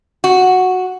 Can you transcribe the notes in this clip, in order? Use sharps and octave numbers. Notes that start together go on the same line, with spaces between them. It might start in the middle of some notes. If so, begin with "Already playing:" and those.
F#4